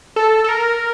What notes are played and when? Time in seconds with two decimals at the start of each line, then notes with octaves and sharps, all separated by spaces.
0.16 A4
0.44 A4
0.49 A#4